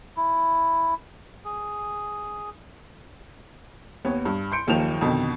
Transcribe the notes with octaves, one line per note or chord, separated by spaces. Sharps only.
E4
G#4
D#2 B3 C#5
G2
C6 G6 C#7 D7
F#1 D#2 D#3 F3 E7 F7
F2 B2 D3 D#3